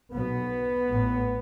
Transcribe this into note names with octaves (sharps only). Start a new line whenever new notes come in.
B1 B2 B3
A1 A2